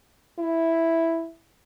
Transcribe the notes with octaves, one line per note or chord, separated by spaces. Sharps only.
E4